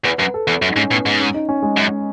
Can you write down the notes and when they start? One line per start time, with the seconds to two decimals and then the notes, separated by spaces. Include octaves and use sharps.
0.05 E2 B4
0.20 F#2 B4
0.34 A4
0.48 E2 A4
0.62 F#2
0.70 D#4
0.76 G#2 C#4
0.91 A2 B3
1.06 G#2
1.20 C#4
1.34 D#4
1.49 C#4
1.62 G#3
1.77 F#2